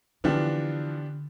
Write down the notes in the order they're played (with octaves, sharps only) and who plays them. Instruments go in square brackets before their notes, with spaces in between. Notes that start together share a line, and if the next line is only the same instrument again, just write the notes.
[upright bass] D3 [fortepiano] E3 F3 [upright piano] B3 D4 G4